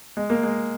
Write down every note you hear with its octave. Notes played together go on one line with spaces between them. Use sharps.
G#3
A#3
G#3